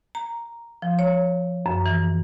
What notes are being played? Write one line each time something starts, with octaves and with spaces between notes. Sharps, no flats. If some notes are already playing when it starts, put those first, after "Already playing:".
A#5
F3
C#5
F#2
E3